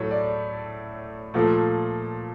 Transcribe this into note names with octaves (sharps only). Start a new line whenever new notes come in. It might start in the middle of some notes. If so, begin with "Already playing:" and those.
Already playing: A2 F#3 A3 C#5
D5
A#2 F3 A3